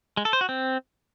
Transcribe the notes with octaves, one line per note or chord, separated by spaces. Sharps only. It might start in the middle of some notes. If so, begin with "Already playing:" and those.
G#3
A4
C5
F#4
C4